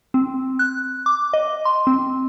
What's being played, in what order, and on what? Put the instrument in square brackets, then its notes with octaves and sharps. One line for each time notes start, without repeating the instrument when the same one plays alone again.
[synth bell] C4
F#6
D6
D#5
C6
C4